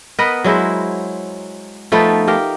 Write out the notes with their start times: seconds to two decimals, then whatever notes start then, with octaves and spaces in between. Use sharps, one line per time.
0.19 B3 A#4 B4 D#5
0.44 F#3 G#3 E4 C5
1.92 F3 A3 B3 D#4
2.28 G4 A#4 F5